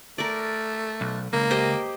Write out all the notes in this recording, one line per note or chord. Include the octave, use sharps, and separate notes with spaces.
A3 A#4 D5
B1
C#2 A#3
G4 C5 D#5